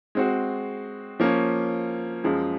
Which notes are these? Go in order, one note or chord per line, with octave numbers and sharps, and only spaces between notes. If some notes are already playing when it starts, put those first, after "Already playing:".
G#3 C4 F#4
F3 A#3 C#4
F#2 F3 G#3